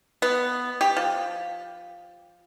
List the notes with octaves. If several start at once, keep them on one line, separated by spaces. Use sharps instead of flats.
B3
G4
F3